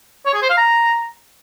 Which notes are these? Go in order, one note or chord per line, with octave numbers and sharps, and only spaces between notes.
C#5
G#4
C5
F5
A#5